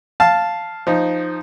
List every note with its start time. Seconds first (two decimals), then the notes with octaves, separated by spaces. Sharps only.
0.20 F5 A5
0.87 F3 D#4